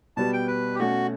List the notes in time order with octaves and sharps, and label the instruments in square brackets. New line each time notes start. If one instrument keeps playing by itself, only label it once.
[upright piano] B2 G3 B3 F#4 [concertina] A5
[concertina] G5
B4
G4
[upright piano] B2 A3 C#4 [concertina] F#4